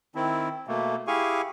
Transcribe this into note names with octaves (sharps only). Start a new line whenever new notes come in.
D#3 C4 E4
B2 A3 A#3
E4 G4 G#4 F5 G#5 C#6